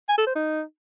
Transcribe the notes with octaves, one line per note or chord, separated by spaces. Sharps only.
G#5
A4
C5
D#4